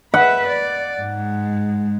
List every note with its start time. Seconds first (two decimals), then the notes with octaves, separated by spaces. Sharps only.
0.14 B4 E5 F#5
0.48 D5
1.00 G#2 G#3